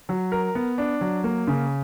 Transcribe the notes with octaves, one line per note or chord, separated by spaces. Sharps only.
F#3
A#4
B3
D4
F#3
A#3
C#3